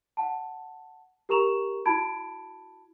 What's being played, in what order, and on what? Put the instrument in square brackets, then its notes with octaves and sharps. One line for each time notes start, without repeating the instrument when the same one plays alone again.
[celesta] F#5 A5
G4 A#4 A#5 C#6 E7 F7
E4 F#4 A5 B5 G#6 D7